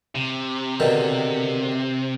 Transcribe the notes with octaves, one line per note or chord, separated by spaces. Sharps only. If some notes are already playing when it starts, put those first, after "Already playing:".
C3
B2 D3 D#3